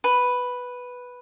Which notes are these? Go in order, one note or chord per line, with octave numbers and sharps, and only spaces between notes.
B4